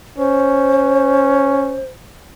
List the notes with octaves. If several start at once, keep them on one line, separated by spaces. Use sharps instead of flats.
C#4 C5